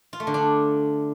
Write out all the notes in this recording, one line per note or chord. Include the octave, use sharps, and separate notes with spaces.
F4
A3
D3
D4